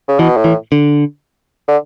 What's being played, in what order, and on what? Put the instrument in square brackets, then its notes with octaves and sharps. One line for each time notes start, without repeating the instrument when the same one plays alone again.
[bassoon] C#3
[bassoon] B2 [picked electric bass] E3
[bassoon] A2
[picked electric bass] E3
D3
[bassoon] D3